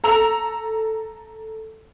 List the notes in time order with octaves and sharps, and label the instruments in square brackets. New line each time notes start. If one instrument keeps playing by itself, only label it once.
[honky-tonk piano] A4 A#5 E6 F7